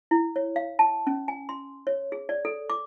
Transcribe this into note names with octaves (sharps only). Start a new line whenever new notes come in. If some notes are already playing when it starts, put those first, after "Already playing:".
E4
C#5
F5
A5
C#4
G#5
C6
C#5
G#4
D5
A4
D6